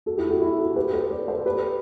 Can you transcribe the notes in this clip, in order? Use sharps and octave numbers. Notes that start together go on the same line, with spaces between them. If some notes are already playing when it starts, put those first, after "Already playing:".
F#4 A4
E4 G4
F#4 A4
E4 G4
F#4 A4
G4 B4
A4 C5
B4 D5
A4 C5
G4 B4